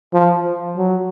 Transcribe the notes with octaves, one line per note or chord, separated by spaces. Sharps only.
F3
F#3